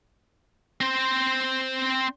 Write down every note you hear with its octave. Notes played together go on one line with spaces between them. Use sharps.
C4 C5